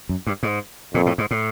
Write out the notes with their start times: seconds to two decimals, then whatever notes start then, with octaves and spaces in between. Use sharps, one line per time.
0.09 F#2
0.27 G2
0.43 G#2
0.94 F2 A#2
1.06 A2
1.18 G#2
1.31 A2